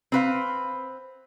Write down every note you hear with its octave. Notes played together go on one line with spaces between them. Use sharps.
C4 B4 F5